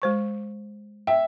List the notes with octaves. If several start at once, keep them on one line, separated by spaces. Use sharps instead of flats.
G#3 C5 C#6
E5 G5